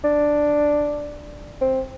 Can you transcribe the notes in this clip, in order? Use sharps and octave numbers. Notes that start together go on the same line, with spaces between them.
D4
C4